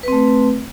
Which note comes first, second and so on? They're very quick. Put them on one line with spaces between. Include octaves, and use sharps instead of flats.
B4 C4 A3